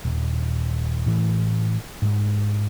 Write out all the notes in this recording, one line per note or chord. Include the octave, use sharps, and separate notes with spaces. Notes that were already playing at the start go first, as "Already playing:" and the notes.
D#1
A2 E3
G#2 G#3